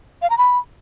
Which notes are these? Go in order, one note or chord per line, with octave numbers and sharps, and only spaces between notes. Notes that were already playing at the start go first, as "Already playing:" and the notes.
F5
A#5
B5